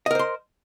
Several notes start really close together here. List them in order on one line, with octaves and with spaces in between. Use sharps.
D#5 A#4 C5 C6